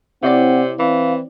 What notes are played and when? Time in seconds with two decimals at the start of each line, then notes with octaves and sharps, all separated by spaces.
0.23 C3 C4 E4 C#5 D5 F#5
0.79 E3 C4 F5